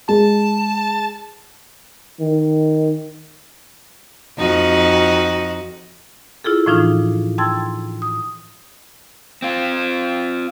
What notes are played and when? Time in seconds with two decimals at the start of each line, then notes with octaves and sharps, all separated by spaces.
0.09 G#3 A5
2.20 D#3
4.38 F2 D#4 F#4
6.44 E4 F4 G#4 A4
6.66 A2 E3 F3 D4 D#4 F4
7.38 G5 A5 C6 E6 G#6 A6
8.02 D#6
9.42 C4 F4